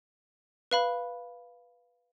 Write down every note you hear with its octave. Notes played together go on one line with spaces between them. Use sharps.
B4 F5 B5